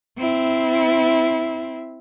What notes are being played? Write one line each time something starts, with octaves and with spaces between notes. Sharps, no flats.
C4 E4